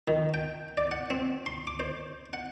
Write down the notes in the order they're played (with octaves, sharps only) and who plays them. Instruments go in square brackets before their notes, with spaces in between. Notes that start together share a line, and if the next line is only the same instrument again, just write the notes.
[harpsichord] D#3
G5
D5
F#5
C4
C6
D6
C5
F#5